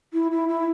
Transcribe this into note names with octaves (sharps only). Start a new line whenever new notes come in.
E4
E4
E4